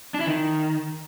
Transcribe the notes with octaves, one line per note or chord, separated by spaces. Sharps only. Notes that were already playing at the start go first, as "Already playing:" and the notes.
D4
E4
D#3